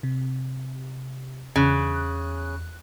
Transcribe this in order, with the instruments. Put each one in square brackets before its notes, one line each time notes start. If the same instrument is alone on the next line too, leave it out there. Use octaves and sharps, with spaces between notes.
[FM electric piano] C3
[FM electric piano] E2 F#6 [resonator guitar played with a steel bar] C#3